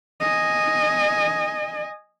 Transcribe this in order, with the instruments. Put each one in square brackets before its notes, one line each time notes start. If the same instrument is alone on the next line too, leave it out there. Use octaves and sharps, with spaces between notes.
[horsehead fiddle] D#5 G#5